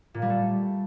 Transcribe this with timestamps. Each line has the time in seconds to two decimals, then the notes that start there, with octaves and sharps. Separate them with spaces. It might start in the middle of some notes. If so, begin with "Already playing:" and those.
0.14 A#2
0.22 G3
0.29 A3